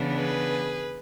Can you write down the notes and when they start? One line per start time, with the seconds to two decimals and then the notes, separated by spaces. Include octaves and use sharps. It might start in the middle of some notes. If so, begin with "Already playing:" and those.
Already playing: C#3 E3 B3 D4
0.14 G#4 B4